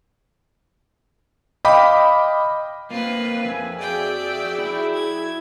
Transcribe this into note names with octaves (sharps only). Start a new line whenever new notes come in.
D#5 F5 G5 B5 D6
A#3 C4 F4 B4
F2 E5 G#5
F#4 G#4 D5 E5 G5
E4
G#6